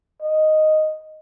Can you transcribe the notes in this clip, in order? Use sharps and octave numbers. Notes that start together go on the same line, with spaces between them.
D#5